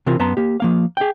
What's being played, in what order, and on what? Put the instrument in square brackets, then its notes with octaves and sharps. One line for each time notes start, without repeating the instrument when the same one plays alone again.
[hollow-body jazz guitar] C3 E3 C4 F4 A#4
F#2 B3 A5 A#5 C6
A#3 G4
F3 A#3 F5
G#4 G5